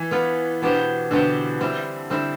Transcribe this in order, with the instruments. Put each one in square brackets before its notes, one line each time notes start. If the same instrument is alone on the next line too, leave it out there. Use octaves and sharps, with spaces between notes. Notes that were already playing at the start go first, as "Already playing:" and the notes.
Already playing: [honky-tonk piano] E3
[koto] B3 F4 B4
B2 B3 D4 G4 C5
[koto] B2 B3 D4 G4 C5 [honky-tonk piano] D3
[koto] G3 C4 E4
[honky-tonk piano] D3 [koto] G3 C4 E4